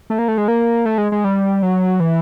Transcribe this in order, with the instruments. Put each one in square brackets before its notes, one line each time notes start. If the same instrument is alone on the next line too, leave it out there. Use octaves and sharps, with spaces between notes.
[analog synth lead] A3
A#3
A3
G#3
A#3
A3
G#3
G#3
G3
F#3
E3